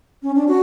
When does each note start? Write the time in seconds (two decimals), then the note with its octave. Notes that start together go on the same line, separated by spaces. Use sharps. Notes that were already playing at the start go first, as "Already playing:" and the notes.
0.23 C#4
0.35 D4
0.48 F#4